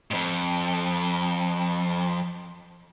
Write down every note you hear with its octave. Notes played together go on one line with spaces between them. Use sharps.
F2 G#2